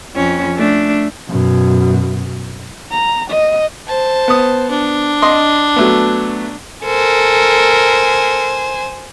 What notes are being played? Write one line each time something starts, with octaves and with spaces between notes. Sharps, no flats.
F2 C#4
A3 D4
F#2 B2
A#5
D#5
C5 A5
B3 D#6
D4
D#5 C6
F#3 A3 B3
A4 A#4 C5 G#5